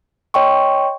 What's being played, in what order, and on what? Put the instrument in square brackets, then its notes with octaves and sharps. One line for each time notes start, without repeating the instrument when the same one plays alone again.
[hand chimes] C#5 D#5 G5 C6 C#6